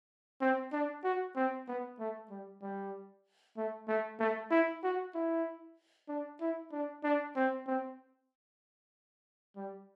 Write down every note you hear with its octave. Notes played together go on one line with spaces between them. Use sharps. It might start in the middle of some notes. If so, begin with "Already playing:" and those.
C4
D4
F#4
C4
B3
A3
G3
G3
A3
A3
A3
E4
F#4
E4
D4
E4
D4
D4
C4
C4
G3